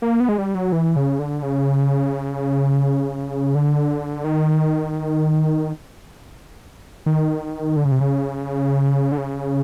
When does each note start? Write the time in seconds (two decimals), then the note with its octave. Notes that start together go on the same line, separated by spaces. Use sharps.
0.02 A#3
0.20 B3
0.29 G#3
0.38 G3
0.55 F#3
0.72 E3
0.96 C#3
1.19 D3
1.43 C#3
3.55 D3
4.24 D#3
7.06 D#3
7.76 D3
7.85 C#3
7.92 C3
8.01 C#3
9.12 D3
9.18 C#3